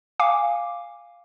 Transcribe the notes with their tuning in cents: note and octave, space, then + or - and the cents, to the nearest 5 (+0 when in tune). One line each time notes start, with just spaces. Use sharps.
F5 +0 G#5 -20 D6 +0